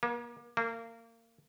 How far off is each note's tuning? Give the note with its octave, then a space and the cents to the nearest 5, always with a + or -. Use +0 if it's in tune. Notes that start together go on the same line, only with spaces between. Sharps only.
A#3 +35
A#3 -30